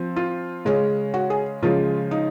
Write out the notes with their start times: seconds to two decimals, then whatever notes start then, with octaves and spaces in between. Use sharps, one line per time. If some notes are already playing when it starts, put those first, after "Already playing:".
Already playing: F3 C4
0.16 F4
0.65 C#3 G#3 C#4
1.14 F#4
1.30 G#4
1.63 C#3 F3 G#3 C#4 F4
2.11 D#4